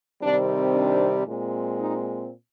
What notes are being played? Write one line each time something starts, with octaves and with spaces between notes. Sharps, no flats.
C3 D#3 G3 C4 D4
D4
A#2 G#3 C4
D#4